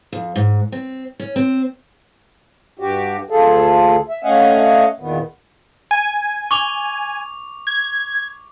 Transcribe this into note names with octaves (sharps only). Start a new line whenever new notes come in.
F2
G#2
C4
C#4
C4
G2 F#4 G4
D2 F4 G#4 A4
E5
A3 C#4 D#5 F5 F#5 G#5
E2 A#2 D#3 B3
G#5
C#6 D6 F7
G#6